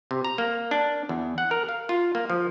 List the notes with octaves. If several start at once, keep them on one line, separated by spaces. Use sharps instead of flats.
C3
A#5
A#3
D4
E2
F#5
A#4
F5
F4
A#3
F3